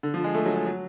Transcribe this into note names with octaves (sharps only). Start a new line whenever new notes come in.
D3
F3
G#3
A3
F#3
G#3
F#3